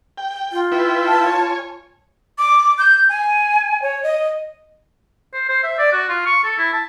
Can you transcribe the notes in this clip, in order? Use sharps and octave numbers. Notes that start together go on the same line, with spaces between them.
G5
F4
E4 B4 G5
A5
C#5 G#5
D6
G6
G#5
C#5
D#5
C5
C5
E5
D5
F#4
F4
C#6
A4
E4
A5